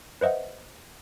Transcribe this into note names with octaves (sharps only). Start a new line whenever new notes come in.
B4 C5 D#5 E5 F#5